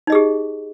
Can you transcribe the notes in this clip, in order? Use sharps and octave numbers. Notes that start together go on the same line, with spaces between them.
D#4 G4 G#4 D#5